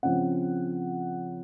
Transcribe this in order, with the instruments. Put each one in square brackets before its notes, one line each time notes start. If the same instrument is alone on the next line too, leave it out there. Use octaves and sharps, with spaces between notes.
[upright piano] C#3 F3 C4 F#5